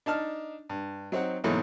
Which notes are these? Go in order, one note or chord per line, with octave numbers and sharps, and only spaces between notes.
D4 D#4 A5 F6
G2
F#3 C4 D#4 F#5
G#2 B2 E3 F#3 A3 A#3